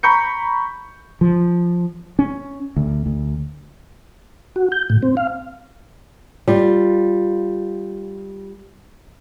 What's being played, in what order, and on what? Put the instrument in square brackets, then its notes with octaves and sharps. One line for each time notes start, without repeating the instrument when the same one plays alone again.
[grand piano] A#5 B5 C#6 G6 C#7
[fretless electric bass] F3
C#4
D2
D2
[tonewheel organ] F#4
G6
A2
C4
F5
[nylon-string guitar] G3 F4